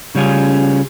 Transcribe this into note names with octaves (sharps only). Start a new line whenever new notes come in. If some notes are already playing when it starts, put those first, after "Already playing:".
C#3 G3 C#4 F4 G#4